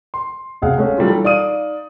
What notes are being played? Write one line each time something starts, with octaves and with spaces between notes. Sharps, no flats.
C6
E1 C3 G#4 F5 F#5
G#3 A3 C#4
E3 F#3 G3 A3 D4 F4
A4
D#4 D5 F5 D#6 D#7